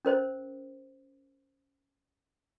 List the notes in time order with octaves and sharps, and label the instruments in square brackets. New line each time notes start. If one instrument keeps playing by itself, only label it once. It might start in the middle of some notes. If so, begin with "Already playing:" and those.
[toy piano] C#4 A#4 C5